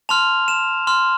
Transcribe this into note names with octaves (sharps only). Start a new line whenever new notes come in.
A5 C6 F6 F7
E7
C6 F6